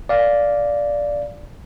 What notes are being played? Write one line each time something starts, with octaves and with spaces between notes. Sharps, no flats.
D5 F5